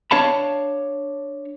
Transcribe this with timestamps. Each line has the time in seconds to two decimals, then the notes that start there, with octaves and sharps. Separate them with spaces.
0.11 D4 C#5 F5 A5 B5